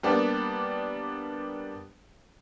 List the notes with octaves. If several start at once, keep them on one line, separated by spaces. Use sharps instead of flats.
G3 A#3 B3 D4 G4